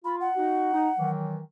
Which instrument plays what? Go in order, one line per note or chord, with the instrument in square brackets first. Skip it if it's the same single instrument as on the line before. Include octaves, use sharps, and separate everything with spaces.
[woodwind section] F4 [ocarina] B5
[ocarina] F#5
[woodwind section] D#4 F#4
D#4
D#3 E3 F#3